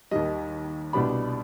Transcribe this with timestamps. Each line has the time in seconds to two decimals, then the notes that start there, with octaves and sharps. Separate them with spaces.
0.11 D#2 D#3 G3 D#5
0.93 C2 B2 G3 B3 D4 B5